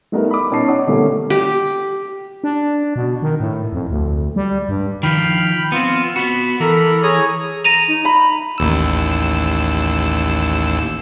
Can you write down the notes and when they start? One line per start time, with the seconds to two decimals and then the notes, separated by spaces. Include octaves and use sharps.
0.12 G3 A3 B3 D#4 E4 A#4
0.31 B5 D6
0.51 B2 C#4 D#4 A5 C7
0.68 D#4 C#5 F#5 D6
0.87 B2 D3 G3 A3 A#3 C#4
1.30 G4
2.44 D4
2.96 B2
3.22 D#3
3.40 A2
3.73 F2
3.90 D2
4.36 G3
4.69 G2
5.03 D#3 F3 G5 B5 F6
5.72 B3 C4 F4
6.16 B3 F#4 B5
6.60 E3 A4 A#4 A#5 B5
7.03 G#4 C#5 A#5 D#6
7.64 A#5 A#6 D#7 F7
7.88 D#4
8.05 A#5 B5
8.58 A1 D#2 E6